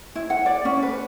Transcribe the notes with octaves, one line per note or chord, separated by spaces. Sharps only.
E4
F#5
D5
C#4
B4